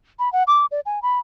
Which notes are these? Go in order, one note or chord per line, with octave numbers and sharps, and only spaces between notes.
B5
F#5
D6
D5
G#5
B5